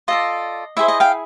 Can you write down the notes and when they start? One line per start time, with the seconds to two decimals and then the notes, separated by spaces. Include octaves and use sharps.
0.08 F4 A4 D5 D#5
0.77 E4 G#4 C5 E5
0.88 D#5
1.00 F5 G5